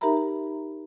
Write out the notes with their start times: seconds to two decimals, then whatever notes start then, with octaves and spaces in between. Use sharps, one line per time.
0.01 D#4 G4 A#4 E5 A#5 B5